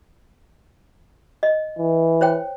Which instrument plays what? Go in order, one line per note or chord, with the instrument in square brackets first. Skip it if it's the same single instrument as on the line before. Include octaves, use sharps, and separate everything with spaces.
[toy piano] D#5
[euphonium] E3
[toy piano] C5 C#5 G5